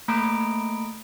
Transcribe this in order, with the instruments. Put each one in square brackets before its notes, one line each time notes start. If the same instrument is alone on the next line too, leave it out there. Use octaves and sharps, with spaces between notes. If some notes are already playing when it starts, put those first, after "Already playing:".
[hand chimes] A3 A#3 A#5 B5 D#6 D7